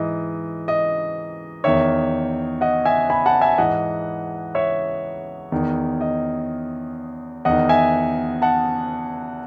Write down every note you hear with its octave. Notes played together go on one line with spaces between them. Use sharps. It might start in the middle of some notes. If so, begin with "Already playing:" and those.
Already playing: G#2 E3 D#5
D#5
E2 D#3 C#5 E5
D#5 F#5
E5 G#5
G#5 B5
F#5 A5
E5 G#5
G#2 E3 D#5 F#5
C#5 E5
E2 D#3
D#5
E2 D#3 D#5 F#5
E5 G#5
F#5 A5